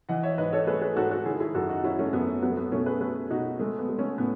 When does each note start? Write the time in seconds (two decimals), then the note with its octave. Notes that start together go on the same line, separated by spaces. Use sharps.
0.09 E3 D#5 F#5
0.23 C#5 E5
0.38 G#2 B4 D#5
0.52 A4 C#5
0.67 A3 G#4 B4
0.82 G#4 B4
0.96 G#2 F#4 A4
1.11 F#4 A4
1.25 D#3 E4 G#4
1.40 E4 G#4
1.55 F#2 F#4 A4
1.70 D#4 F#4
1.84 F#3 C#4 E4
1.99 A3 C#4
2.13 F#2 B3
2.42 F#3 B3
2.50 A3
2.57 B3
2.72 B2 A3 C#4
2.86 G#4 B4
3.01 A3 G#4 B4
3.30 B2 D#4 F#4
3.59 G#3 A3
3.79 B3
3.89 G#3
3.99 A3 C#4
4.18 A2 B3